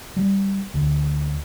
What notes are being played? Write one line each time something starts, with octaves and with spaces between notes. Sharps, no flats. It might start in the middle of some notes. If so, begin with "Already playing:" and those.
G3
D2